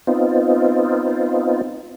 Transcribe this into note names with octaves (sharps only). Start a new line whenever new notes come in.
B3 C4 D#4 F4